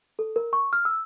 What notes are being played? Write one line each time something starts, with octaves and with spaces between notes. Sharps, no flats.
A4
A#4
C#6
F6
E6